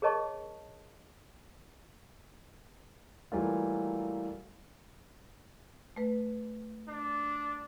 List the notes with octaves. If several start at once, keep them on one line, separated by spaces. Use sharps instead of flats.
G#4 A#4 C#5 D#5 A5 C#6
E3 F#3 G3 A3 A#3 F4
A3 B4
D4